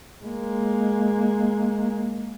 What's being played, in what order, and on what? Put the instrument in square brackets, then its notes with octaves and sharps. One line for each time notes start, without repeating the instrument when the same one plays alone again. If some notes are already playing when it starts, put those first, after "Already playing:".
[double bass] G#3 A#3